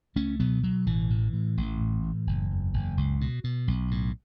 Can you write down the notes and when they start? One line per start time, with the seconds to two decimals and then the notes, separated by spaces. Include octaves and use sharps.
0.16 C#2 A3 C#4
0.40 B2 F#3 B3
0.63 B2 F#3
0.86 A1 E3
1.10 A2
1.33 A2
1.57 A1
1.81 A2
2.03 A2
2.27 F#1
2.51 E2
2.73 F#1
2.97 C#2
3.21 B2
3.44 B2
3.68 B1
3.91 A2